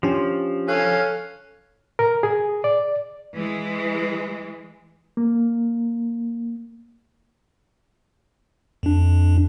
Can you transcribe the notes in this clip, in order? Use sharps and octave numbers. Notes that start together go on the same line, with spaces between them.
F3 C#4 D4 G4
C#4 A4 F5 F#6
A#4
G#4
D5
E3 G#3
A#3
F2 D4